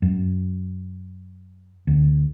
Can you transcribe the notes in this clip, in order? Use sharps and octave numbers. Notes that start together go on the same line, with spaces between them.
F#2
D2